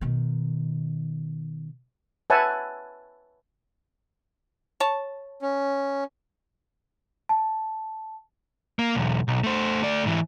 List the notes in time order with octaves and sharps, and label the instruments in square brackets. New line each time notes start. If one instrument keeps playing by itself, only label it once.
[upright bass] B2 D#3
[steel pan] B4 C#5 E5 F#5 G#5 A5
[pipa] C#5 A5
[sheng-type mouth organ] C#4
[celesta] A5
[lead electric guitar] A#3
B1 E2
B1
A3 C5
A3 D5
G#2 E3